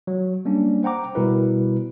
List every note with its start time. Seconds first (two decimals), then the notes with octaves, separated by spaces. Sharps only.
0.07 F#3
0.45 G3 A#3 C#4 D4
0.83 C5 F#5 G5 A#5 D6
1.15 B2 G3 E4 A#4 B4